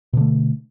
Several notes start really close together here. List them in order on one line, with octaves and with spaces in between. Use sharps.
B2 D3 A3